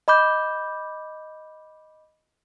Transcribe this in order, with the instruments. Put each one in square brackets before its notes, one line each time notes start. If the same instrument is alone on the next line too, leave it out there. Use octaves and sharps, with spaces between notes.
[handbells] D#5 B5 D6 G6